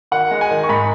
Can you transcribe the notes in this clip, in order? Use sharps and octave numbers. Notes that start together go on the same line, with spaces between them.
D#3 F#5
G#3
G#5
D#3
C#6
G#2 B5